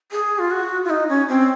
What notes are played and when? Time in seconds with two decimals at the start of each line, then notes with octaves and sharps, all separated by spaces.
0.12 G#4
0.39 F4
0.51 F#4
0.85 F4
0.90 D#4
1.09 C#4
1.29 C4